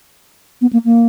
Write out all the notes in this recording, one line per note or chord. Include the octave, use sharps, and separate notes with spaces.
B3
A#3
A#3